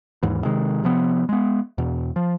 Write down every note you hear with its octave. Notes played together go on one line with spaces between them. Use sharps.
D#2 G#2 E3
C3 D#3 G#3
C3 F3 B3
G#3 B3
E2 B2
F3